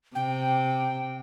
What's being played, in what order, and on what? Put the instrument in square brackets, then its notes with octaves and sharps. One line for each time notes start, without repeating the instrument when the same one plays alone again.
[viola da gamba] C3 [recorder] G5